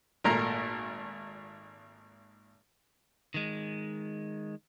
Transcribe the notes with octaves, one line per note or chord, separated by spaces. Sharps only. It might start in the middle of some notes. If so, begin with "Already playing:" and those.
G#1 A#2 A3 A#4 A#5
D#3 G#3